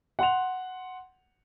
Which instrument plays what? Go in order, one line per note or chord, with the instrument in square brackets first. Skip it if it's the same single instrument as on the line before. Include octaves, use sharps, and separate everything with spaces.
[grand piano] F#5 C6 F7